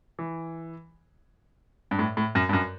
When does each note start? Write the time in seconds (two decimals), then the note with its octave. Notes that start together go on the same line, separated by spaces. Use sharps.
0.19 E3
1.91 G2
1.99 A2
2.17 A2
2.35 F#2
2.49 G2
2.53 F#2